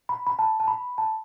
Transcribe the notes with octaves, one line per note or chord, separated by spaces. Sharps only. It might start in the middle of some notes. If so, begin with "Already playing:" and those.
B5
B5
A5
A5
B5
A5